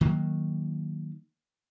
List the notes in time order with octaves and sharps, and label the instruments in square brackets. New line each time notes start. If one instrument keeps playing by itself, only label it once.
[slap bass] D#3 F#3 A#3